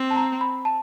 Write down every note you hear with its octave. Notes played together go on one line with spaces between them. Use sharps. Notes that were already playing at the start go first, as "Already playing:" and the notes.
Already playing: C4
A5
A#5
B5
A5